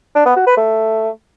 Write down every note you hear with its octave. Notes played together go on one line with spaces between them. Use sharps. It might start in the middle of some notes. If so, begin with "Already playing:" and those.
D4
B3
F#4
B4
A3